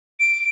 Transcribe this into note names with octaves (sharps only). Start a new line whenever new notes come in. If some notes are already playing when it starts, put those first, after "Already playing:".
D7